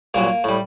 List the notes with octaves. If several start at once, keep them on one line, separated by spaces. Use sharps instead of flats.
C2 A#2 F#3 A#3
A2 G3